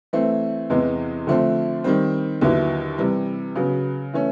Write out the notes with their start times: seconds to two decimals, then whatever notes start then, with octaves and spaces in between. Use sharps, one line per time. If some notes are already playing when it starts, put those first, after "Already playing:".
0.13 E3 A3 C4
0.70 E2 C3 E3 G#3
1.27 D3 F3 A3 C4
1.84 D#3 G3 C4
2.41 D#2 D3 F#3 B3 E4
2.98 C3 E3 G3
3.55 C#3 F#3 B3
4.14 E3 A3 C#4